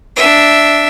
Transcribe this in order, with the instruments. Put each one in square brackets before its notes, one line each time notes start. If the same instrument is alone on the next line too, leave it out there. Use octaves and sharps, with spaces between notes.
[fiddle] D4 E5